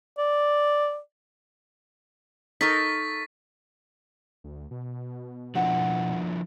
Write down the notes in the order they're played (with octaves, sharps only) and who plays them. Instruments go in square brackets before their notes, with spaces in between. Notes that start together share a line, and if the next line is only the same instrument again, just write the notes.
[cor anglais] D5
[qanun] D#4 A4 A#4 [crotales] C#6 A6 B6
[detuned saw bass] D2
B2
[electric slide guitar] F3 D4 E4 [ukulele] F#5